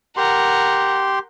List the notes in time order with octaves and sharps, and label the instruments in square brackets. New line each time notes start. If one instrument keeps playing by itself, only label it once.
[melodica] G4 C6 [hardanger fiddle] A#4 F#5